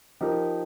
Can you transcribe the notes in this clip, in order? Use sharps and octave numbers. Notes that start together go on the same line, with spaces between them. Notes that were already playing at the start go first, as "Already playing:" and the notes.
F3 D#4 G4 A#4